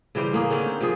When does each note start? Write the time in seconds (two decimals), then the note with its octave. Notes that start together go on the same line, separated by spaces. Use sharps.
0.15 C#3 E3 G3 C5
0.33 A2 A#3 G#4 A#4
0.50 D3 D#3 C4 C#4
0.67 C5
0.80 C3 F3 G#4